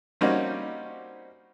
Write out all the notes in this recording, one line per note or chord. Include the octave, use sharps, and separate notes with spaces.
G3 A#3 C4 C#4 D#4 F#4